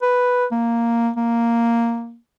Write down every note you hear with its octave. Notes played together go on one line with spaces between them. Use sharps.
B4
A#3
A#3